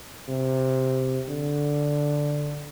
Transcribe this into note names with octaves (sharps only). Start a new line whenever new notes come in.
C3
D3